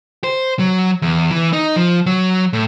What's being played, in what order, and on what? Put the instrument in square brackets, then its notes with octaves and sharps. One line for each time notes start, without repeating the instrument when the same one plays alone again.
[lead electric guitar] C5
F#3
E2
E3
D#4
F3
F#3
A2